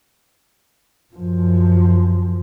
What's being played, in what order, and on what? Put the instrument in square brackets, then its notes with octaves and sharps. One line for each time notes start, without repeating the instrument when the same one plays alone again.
[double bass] F#2 F3